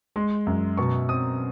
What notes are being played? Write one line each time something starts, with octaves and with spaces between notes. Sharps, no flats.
G#3 C6
F#2
B2 C#6
C4 D#6